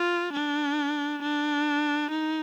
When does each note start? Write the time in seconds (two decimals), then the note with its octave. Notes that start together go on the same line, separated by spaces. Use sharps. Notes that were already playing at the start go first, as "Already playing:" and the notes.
Already playing: F4
0.33 D4
1.22 D4
2.11 D#4